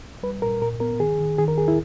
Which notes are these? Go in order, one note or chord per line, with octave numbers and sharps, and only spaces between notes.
G3 B4
A#2 A#4
A#2 A#4
B3 A#4
D#3 G#4
D#3
D#3 G#4
A#4
D#2 G#4
E4